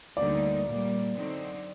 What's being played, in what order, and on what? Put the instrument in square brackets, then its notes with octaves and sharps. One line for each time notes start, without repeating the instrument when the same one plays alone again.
[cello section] D2 D3 G3 A#3 D#4 [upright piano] D5
[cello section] A#2 G3 A#3
D3 F#3 C4 D#4